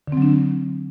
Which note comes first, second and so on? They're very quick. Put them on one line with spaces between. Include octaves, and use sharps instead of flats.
D3 C4 F#3 D4